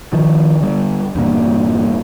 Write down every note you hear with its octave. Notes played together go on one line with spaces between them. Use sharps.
D#3 F3
D3 G3
E2 G2 A#2